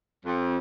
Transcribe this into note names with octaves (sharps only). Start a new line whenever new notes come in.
F2